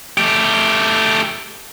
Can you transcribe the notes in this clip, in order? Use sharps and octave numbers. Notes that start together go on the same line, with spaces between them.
A3 G4